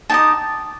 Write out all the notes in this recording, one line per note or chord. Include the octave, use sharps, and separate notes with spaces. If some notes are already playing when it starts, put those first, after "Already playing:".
D#4 G4 D#5 A5